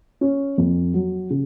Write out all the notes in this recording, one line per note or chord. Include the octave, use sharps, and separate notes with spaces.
C#4
F2
F#3
C#3